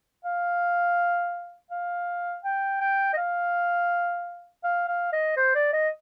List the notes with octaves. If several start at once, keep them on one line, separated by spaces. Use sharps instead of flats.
F5
F5
G5
G5
D#5
F5
F5
F5
D#5
C5
D5
D#5